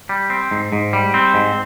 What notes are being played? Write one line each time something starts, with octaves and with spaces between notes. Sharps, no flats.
G3
C4
G#2
G#2
G3
C4
G#2